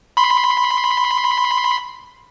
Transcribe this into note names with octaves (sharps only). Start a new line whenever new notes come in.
B5 C6